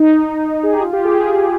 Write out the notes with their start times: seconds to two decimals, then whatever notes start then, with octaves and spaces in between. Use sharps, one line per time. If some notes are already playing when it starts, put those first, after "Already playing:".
Already playing: D#4
0.63 G#4
0.72 G4
0.81 F4
0.93 G4
1.05 G#4